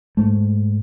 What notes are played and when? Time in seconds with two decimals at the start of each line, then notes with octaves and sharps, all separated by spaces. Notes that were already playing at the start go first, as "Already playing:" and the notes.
0.17 G#2 A3